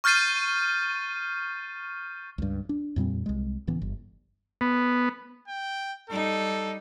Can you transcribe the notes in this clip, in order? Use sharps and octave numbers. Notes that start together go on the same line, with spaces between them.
C#6 F6 G6 A6 C7 D#7
C#2 G2
D4
F2 A#2 G3 C4
C2 G#3
C#2 A2 E3 B3
G1
B3
G5
G3 D#4 A4